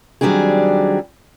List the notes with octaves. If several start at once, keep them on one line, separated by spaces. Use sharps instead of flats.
D#3 F#3 G3 C4 D4 G#4